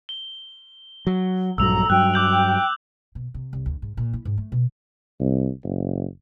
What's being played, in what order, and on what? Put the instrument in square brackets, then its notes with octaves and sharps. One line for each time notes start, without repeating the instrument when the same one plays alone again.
[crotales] G7
[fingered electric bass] F#3
[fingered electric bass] A#1 G2 F#3 [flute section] A4 A#5 [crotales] E6 F7
[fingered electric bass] G2 F#3 [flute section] G5 [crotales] F#6
[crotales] D6 G6 F#7
[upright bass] B2
C3
C2
D2
G#2
A#2
E4
G#2
A3
B2
[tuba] C2
F#1